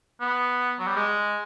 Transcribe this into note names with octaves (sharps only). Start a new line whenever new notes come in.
B3
F#3
G3
G#3